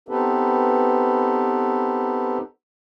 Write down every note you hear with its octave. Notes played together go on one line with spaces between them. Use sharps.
B3 C4 D#4 G4 A4 B4